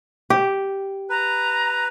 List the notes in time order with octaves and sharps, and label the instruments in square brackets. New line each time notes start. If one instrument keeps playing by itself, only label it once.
[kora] G4
[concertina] B4 [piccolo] A#5